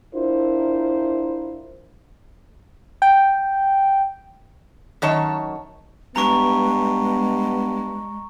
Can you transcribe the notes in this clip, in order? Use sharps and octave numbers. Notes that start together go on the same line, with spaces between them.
D4 E4 F4 A#4 C5
G5
F#2 D#3 C#5 A5
G2 G#3 B3 A#5 C#6